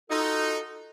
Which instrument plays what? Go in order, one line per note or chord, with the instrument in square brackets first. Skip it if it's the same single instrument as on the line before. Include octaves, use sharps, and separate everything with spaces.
[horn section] D#4 [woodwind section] F4 F#4 A4